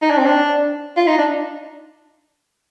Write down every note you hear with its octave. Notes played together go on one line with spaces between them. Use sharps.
D#4
D4
C4
D4
F4
D#4
D4